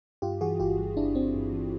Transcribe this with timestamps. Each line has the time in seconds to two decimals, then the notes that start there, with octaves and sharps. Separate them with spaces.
0.22 G2 F4 G4
0.41 E3 F#4 G#4
0.59 G1 F4 G4
0.78 G2
0.97 G1 D4 E4
1.15 G1 C4 D4
1.34 G1
1.53 E3